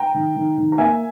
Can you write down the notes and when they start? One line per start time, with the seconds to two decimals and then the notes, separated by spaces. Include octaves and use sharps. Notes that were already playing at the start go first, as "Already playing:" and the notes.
Already playing: G5 A#5
0.14 D#3
0.36 D#3
0.58 D#3
0.72 A#5
0.78 A#3 E5 G#5